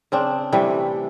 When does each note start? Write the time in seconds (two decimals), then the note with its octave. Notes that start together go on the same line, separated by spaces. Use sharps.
0.12 C#3 C4 D4
0.53 C3 E3 G3 A3